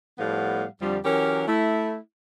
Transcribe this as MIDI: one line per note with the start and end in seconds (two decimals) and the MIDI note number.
0.19 0.65 45
0.19 0.65 53
0.19 0.65 55
0.19 0.65 59
0.19 0.65 77
0.19 0.65 78
0.82 0.99 41
0.82 0.99 50
0.82 0.99 53
0.82 0.99 55
1.05 1.46 52
1.05 1.46 54
1.05 1.46 61
1.05 1.46 67
1.05 1.46 70
1.48 1.98 57
1.48 1.98 64